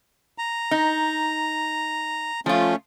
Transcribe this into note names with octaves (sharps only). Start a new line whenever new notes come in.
A#5
D#4
F3 A3 C#4 F4